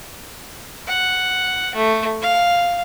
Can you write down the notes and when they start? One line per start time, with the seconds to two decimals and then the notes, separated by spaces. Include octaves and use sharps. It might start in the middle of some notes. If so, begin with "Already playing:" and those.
0.87 F#5
1.75 A3
2.22 F5